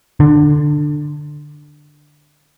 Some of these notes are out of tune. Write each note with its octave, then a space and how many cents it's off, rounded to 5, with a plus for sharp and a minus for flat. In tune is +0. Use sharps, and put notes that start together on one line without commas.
D3 +15